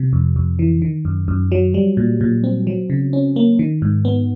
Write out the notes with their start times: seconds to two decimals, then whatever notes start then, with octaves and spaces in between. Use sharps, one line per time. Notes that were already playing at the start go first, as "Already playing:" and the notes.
Already playing: C3
0.13 F2
0.36 F2
0.59 E3
0.82 D#3
1.05 F#2
1.28 F#2
1.52 F#3
1.74 G3
1.97 A#2
2.21 A#2
2.44 C4
2.67 F#3
2.90 C#3
3.13 C#4
3.36 A#3
3.59 D#3
3.82 G#2
4.05 B3